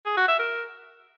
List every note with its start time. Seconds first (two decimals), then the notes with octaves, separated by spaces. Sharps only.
0.06 G#4
0.17 F#4
0.28 E5
0.39 A#4